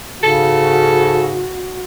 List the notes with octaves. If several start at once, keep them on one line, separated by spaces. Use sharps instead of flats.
G#2 C#3 F#4 A4